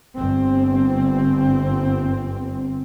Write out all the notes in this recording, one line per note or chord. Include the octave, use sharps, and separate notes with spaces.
G1 C4